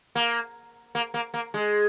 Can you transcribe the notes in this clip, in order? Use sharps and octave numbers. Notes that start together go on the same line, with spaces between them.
A#3
A#3
A#3
A#3
G#3